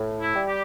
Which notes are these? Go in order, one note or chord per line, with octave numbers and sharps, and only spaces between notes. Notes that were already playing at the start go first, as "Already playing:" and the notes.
Already playing: A2
E4
G3
G4